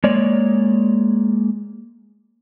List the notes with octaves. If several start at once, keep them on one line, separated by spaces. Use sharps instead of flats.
G#3 A#3 C#5 D5